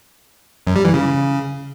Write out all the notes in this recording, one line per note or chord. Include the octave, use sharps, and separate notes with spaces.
F#2
G3
E3
C#3